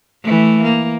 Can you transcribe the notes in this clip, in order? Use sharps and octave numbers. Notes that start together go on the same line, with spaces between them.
E3 A3
A#3